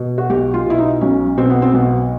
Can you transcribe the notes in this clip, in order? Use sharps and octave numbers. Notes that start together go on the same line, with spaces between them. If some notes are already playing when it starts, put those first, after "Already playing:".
Already playing: B2
F#4
B1 G4
F4
B2 E4
D#4
B1 C#4
B2 C4
B3
C4
B1 B3